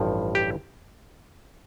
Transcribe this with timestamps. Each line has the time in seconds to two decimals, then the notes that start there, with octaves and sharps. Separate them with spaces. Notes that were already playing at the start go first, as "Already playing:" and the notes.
Already playing: A1 G2 F3
0.35 G4